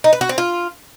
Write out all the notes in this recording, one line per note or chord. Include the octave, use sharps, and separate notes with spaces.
D#4
B4
F#4
C4
F4